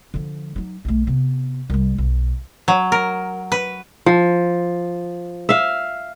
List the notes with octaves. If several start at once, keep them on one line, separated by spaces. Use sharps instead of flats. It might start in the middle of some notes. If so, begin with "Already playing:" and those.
D3 F3
F#3 D#4
B1 A3
C3 B3
C2 G3
B1
F#3
A#4
B4
F3
E5 F5